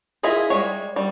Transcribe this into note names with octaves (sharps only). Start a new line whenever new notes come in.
E4 F4 G#4 D#5 E5
G3 G#3 C#5
G3